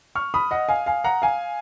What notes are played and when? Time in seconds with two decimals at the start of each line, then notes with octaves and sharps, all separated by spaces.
0.15 C#6 F6
0.34 B5 D#6
0.51 D#5 F#5
0.69 F5 G#5
0.86 F5 G#5
1.04 F#5 A#5
1.22 F5 G#5